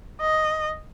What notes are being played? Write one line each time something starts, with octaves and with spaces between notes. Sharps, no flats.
D#5